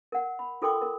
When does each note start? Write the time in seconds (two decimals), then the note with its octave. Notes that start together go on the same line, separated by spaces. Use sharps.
0.12 A#4 F#5
0.39 B5
0.62 F4 A4 A#4 G5 C6 D6
0.82 A#4